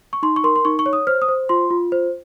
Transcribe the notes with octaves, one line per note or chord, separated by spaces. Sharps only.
C#6
D#4 C6
C#6
A#4 C6
C6
D#4 C#6
C#6
C#5
D#6
C5 F6
D#6
C5
F4 C6
F4
C5